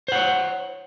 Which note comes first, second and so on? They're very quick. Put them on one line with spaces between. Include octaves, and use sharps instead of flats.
C5 F#5 C#5